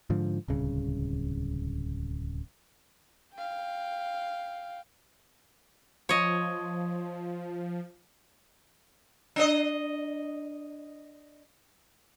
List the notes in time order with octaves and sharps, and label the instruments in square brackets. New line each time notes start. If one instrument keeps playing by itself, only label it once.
[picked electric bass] G#2 D3 F3
D1 C2 C#3
[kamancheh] F5 G5
[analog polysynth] F3 [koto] C#5 D#5
[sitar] D4 D#5